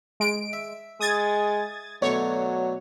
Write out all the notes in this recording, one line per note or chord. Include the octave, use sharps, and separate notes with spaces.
G#3 D7
E5
G#3 D#6 G#6 A6
B2 D3 F#3 A3 C#5